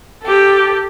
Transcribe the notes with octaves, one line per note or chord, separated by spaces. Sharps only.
G4 A4